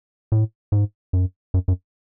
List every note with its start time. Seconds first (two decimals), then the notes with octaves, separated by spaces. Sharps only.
0.32 A2
0.72 G#2
1.13 F#2
1.54 F#2
1.68 F#2